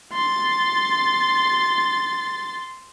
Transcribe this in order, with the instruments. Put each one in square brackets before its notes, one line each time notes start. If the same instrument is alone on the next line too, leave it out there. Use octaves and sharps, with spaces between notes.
[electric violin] C6 A6